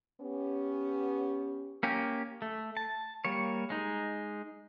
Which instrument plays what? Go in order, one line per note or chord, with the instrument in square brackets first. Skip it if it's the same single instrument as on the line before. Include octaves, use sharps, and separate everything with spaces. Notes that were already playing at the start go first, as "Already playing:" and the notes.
[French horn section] B3 C#4 G4
[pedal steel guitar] A#3 C#4 G4
A3
A5
G3 A#3 C#5
G#3 D#4